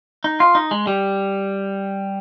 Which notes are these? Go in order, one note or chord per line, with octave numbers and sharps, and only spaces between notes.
D#4
F4
D#4
G#3
G3